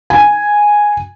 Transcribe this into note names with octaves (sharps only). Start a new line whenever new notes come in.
G#5